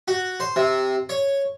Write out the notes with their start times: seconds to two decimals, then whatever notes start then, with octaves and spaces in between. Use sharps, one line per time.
0.08 F#4
0.40 C5
0.56 C3
1.09 C#5